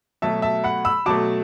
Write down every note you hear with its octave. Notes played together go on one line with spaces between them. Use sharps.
B2 F#3 A3 E5 A5
E5 A5
F#5 B5
B5 E6
B2 F#3 A3 A5 D6